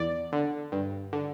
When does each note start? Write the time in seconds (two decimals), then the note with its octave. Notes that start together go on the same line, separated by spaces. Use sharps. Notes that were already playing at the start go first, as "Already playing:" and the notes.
Already playing: E2 D5
0.32 D3
0.72 G2
1.13 D3